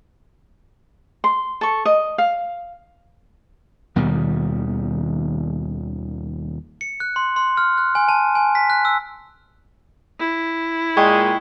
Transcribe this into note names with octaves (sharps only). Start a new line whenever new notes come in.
C6
A4 C#6
D#5
F5
D#2 B2 D#3 G3
C#7
F#6
C6
C6
F6
F#6
G#5
A5
G#5
B6
F#6
E6
E4
A#2 G#3 G5 C#6 G#6